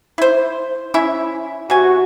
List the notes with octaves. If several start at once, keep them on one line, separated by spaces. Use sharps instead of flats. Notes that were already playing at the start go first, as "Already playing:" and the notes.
E4 C5
C#4 E4 E5
C3 F#4 G#5